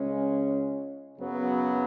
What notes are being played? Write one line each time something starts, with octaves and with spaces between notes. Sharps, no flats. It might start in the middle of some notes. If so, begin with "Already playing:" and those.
Already playing: C#2 C#3 G#3 C#4
F#2 C#3 F#3 B3